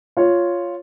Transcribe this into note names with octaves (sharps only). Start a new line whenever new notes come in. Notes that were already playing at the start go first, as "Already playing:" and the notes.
F4 C#5